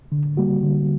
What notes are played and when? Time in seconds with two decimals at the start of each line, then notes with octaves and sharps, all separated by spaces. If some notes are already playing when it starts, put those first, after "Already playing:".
0.12 D3
0.37 G3 A#3 F#4
0.63 D3